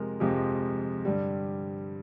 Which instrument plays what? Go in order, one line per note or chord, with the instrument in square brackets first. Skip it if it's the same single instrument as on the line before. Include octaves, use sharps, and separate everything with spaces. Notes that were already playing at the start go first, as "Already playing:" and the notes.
Already playing: [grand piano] F2 C3 F3 G#3 A#4
F2 C3 F3 G#3
G2 D3 G3